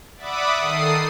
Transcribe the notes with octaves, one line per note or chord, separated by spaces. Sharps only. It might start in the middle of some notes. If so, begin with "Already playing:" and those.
D5 E5 F#5 B5 D6 D#6
D#3 A4 D#6 C7